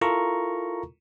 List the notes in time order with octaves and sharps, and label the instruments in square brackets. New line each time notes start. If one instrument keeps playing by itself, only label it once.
[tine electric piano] E4 F4 A4 A#4 A#5 C#6